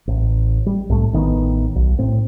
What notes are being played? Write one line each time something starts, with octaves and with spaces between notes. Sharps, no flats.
A1
G3
C2 A2 A3
A1 D#3 A3 B3
B1
A2 C4